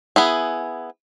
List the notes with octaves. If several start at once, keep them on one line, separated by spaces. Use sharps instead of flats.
B3 E4 G#4